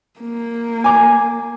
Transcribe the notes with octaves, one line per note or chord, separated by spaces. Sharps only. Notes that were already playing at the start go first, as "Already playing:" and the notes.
A#3
G#5 D6